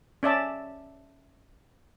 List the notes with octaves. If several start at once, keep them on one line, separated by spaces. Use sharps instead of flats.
C#4 D5 E5 A5